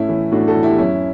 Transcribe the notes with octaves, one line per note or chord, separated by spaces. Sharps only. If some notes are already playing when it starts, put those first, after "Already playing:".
Already playing: A2 C#4 E4
E3
A2 D4 F#4
F#4 A4
E3
E4 G4
F#2 C#4 E4